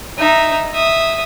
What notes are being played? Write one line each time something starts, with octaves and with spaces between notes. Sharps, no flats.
D#4 E5
E5 D#6